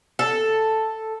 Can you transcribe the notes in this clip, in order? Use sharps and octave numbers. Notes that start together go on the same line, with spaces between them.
A4